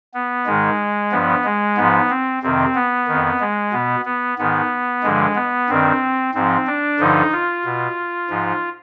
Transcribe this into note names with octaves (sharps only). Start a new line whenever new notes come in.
B3
G#2 D#3 G#3
G2 F3 B3
G#3
G#2 F3 B3
C4
F2 C3 D#3 C4
B3
F2 D#3
G#3
B2 B3
B3
G#2 D#3 B3
G2 D3 F3 G#3
B3
G2 D#3 C4
G#2 F3 C4
D4
G2 D3 F3 D#4
F4
B2
G#2 F3